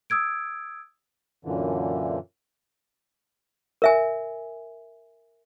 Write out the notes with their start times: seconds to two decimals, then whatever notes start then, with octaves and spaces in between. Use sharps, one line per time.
0.10 D#6 E6 G#6 D7
1.45 F#2 A#2 D3 E3
3.82 A#4 E5 G#5